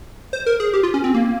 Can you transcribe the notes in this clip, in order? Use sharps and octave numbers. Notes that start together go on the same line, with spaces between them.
C5
A#4
G#4
G4
F4
C#4
C4
A#3